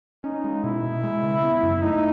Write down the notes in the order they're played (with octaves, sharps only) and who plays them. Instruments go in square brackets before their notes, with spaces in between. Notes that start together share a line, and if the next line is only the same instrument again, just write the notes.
[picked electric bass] C#4 [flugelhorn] D#4
[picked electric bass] G#3
[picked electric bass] B2 [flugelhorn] E4
[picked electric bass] B2
G#3
C#3
B3
F#2
[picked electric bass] A3 [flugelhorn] D#4